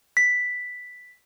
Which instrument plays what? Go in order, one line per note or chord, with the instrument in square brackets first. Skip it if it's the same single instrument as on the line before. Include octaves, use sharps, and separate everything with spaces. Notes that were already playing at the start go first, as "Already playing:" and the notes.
[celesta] B6